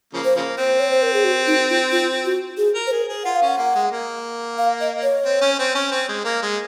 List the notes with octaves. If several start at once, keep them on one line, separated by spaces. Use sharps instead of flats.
C#3 F3 A#3
C5
C#3 F3 A#3
C4 C5
C#5
C5
A#4
G#4
F#4
D#4
F4
F4
F#4
G#4
A#4
C5
G#4 A#4
G#4
F4 F#5
F5
C#4
F#5
A#3
G#3
A#3
F5
D#5
C#5
C4
C#4
C4
C#4
C4
G#3
A#3
G#3